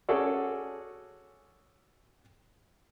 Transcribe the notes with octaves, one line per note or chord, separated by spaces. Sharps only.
C#4 F#4 G#4 A4 D5